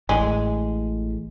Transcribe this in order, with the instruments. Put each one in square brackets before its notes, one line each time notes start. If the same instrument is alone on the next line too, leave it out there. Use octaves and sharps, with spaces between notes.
[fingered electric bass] A1 A2 [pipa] G#3